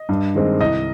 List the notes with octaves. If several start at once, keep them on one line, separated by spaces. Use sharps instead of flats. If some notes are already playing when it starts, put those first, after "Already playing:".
Already playing: D#5
G2
D#3 G#3 C4
C2 D#5